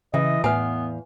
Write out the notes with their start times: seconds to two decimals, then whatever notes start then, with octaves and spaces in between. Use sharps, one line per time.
0.14 C#3 E3 D#5
0.44 E2 A2 B3 B4 F5 G#5